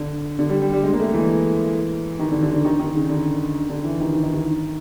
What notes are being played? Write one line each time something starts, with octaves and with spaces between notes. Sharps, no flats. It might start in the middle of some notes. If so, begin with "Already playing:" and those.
Already playing: D3
D3
G3
G3
G3
G#3
A#3
A3
E3
D#3
D3
D3
D3
D#3
D#3
C#3
D3
D3
E3
D#3
D#3
D#3
D#3